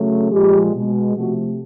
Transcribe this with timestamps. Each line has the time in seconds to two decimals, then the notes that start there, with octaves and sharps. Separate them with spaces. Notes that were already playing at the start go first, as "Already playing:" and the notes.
Already playing: C#3 F#3 A3
0.30 A#2 F3 G#3 G4
0.73 B2 G#3
1.15 C3 F3 A3 F#4